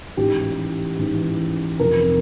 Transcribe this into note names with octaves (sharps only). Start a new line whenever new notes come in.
A1 G#2 E3 G4
A1 G#2 E3
F1 F2 C3 A#4